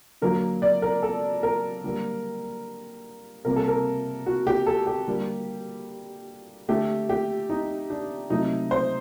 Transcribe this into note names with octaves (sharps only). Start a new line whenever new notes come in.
D3 F#3 A#3 A#4
D5
A#4
A4
A#4
D3 G3 A#3
C3 G3 A#3 A#4
A4
A#4
F#4
G4
A4
G4
D3 G3 A#3
D3 A3 G4
G4
D#4
D4
C3 F#3 A3 D#4
C5